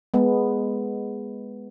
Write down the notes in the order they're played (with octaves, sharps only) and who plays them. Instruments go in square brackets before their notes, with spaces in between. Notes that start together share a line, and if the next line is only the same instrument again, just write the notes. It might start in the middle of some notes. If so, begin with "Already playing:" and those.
[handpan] G#3 B3